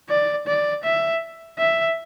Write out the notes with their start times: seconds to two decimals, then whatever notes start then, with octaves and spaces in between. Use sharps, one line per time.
0.09 D5
0.47 D5
0.84 E5
1.58 E5